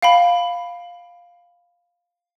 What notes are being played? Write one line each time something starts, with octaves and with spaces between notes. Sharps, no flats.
F5 G5 B5